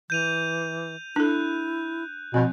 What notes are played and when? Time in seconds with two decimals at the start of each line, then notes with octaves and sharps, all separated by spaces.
0.10 E3 G6 D#7 F7
1.16 D4 E4 A4 F#6
2.34 B2 F3 C4